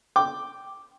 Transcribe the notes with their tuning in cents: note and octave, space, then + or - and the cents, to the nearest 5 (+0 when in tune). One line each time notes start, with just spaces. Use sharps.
G5 +0 D6 +0